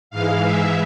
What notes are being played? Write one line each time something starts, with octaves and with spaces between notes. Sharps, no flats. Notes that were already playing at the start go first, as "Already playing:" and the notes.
G#2 E3 G#3 F5
E5